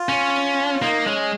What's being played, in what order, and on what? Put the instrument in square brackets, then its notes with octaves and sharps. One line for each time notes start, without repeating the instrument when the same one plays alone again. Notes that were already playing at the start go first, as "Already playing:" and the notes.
Already playing: [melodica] F4
[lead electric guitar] C#4
[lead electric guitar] A#3 [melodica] D#4
[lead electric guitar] G#3 [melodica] C#4